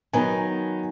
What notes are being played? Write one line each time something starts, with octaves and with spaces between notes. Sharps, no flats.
D#3 F#3 B3 D#4 G#5